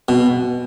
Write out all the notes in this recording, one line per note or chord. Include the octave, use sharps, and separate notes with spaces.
B2